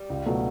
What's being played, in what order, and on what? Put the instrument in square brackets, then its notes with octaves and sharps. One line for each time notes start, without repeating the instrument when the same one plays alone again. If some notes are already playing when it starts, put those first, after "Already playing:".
Already playing: [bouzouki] G3
[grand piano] C#2
B2 F#3 A3